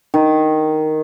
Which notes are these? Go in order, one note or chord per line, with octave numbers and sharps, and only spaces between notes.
D#3